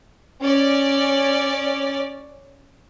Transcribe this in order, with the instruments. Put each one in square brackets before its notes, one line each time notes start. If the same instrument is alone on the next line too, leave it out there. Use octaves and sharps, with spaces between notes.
[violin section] C#4 D5